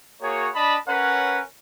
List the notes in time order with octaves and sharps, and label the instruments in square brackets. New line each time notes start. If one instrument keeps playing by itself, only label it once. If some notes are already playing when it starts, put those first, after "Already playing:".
[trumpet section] A#3 F#4 G#4 C#5
D4 D#5 A5 B5
C#4 A#4 B4 C#5 F#5